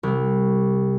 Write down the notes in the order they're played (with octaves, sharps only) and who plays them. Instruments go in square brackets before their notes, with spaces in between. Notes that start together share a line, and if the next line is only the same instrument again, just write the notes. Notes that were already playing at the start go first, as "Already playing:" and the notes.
[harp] C2